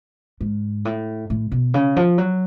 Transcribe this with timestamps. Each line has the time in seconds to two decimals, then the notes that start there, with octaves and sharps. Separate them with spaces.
0.41 G#2
0.85 A2
1.30 A2
1.51 B2
1.74 C#3
1.96 F3
2.18 F#3